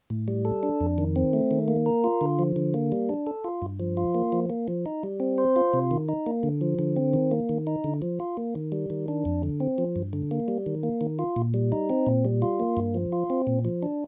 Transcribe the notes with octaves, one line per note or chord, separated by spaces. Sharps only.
A2
G3
A4
D4
F2
D#3
C4
A3
D#3
A#3
A#4
F4
D3
F3
D3
A#3
G3
D4
A4
F4
G2
F3
F4
A#3
F3
A#3
F3
D#4
G3
C4
C5
F4
C3
D#3
D#4
A#3
D3
F3
D3
C4
D#3
A#3
D#3
D#4
D3
F3
F4
A#3
D#3
G3
D#3
D4
F2
D3
C4
F3
G2
D3
A#3
G3
D#3
A#3
D#3
F4
A#2
G3
D#4
C4
A#2
G3
F4
A#3
G2
F3
F4
C4
A#2
F3
D4